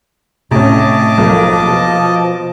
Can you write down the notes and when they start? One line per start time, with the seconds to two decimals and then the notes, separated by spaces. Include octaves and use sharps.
0.51 A2 C3 C#4 D#5 A5 D6
1.18 B1 F3 A3 A#3
1.67 B2